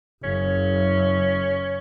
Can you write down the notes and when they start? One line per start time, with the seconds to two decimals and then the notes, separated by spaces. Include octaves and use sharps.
0.24 F#1 C#4